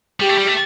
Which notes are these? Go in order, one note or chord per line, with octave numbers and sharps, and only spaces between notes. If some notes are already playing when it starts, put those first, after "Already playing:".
G3 G4
A3
G3
A3